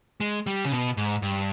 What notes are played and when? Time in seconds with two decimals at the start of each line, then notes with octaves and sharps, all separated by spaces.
0.20 G#3
0.47 G3
0.65 C#3
0.72 B2
0.97 G#2
1.22 G2